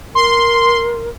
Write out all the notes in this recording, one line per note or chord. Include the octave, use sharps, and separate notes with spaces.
A#4 C6